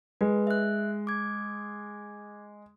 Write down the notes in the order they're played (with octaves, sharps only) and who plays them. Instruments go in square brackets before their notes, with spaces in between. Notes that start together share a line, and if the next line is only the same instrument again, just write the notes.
[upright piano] G#3 [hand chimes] B4
[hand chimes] E5 F#6
D6 G#6